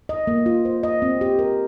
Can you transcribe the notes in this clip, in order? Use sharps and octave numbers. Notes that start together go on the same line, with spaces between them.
D#5
A#3
F4
C5
D#5
C4
G4
A#4